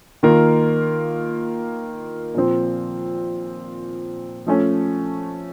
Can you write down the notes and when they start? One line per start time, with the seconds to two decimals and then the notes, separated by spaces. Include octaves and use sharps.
0.23 D#3 A#3 F4 A#4
2.35 A#2 F3 C4
4.46 F3 A3 C#4